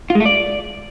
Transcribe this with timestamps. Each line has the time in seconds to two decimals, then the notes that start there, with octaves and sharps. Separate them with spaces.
0.10 F4
0.15 G#3
0.20 A3
0.26 D5